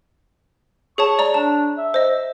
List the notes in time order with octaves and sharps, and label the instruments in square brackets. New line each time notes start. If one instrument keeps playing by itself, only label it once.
[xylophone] G#4 C#5 A5 [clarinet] C#6
[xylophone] D5 A#5
[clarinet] D4 [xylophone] A5
[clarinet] E5
[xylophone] C5 D#5